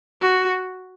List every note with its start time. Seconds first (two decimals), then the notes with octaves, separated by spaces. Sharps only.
0.21 F#4